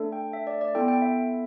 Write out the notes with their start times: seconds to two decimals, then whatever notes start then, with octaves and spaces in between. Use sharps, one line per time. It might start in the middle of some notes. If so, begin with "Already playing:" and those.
Already playing: A3 D4 A4
0.12 G5
0.33 E5
0.47 D5
0.61 D5
0.75 B3 E4 A4 G5
0.88 G5
1.02 E5